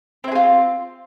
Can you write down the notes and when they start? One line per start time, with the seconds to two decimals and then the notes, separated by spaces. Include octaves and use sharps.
0.24 C4
0.28 E4
0.32 G#4
0.35 F4